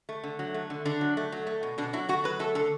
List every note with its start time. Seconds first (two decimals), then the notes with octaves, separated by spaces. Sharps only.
0.09 A3
0.24 D3
0.39 F#3
0.54 A3
0.70 D3
0.85 D3 D4
1.01 F#3
1.17 A3
1.32 F#3
1.47 A3
1.63 B2
1.78 B2 D4
1.93 F#3 E4
2.09 A3 F#4
2.24 F#3 B4
2.39 A3 A4
2.55 D3 A4